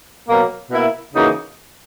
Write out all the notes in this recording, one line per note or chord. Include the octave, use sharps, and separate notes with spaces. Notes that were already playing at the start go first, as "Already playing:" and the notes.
B2 F#3 A#3
B2 A#3 E4
C#3 E3 A#3 D#4 F#4